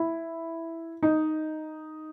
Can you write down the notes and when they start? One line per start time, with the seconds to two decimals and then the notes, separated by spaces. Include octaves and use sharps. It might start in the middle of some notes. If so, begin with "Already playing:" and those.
Already playing: E4
1.03 D#4